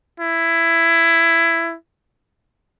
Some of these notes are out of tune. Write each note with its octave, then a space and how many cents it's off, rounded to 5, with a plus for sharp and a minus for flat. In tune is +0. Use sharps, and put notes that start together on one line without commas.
E4 +15